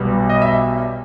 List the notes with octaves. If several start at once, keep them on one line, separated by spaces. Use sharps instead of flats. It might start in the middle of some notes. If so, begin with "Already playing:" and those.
Already playing: B1 B2 G3
D#5
E5